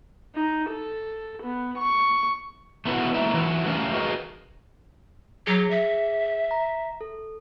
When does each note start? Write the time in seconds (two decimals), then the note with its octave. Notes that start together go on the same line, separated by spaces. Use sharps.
0.35 D#4
0.69 A4
1.42 B3
1.78 C#6
2.85 A3 B3 E4 F#4
3.14 G#3 A#3 E4 E5
3.34 E3 F#3
3.66 A3 C#4 E4 G4 A#4 F5
3.94 F#4 G#4 A#4 B4 D#5 F5
5.47 F#3 G#4 A#6 C#7
5.71 E5
6.51 A#5
7.01 A4